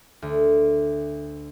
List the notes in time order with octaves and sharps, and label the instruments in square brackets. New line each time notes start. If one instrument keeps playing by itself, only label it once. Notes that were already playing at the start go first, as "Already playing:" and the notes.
[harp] D2